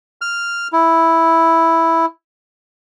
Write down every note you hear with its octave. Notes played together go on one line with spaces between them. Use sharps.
F6
E4